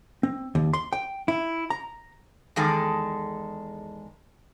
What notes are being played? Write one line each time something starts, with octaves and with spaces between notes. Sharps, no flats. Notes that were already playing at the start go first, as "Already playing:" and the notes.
C4
D#2
C6
G5
E4
A#5
E2 D#3 G#3 A4